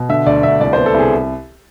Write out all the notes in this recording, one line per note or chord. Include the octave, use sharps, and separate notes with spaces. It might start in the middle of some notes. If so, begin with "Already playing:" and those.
Already playing: B2
D3 E5
D2 D5
D2 E5
C2 D5
B3 C5
A4
C2 G#4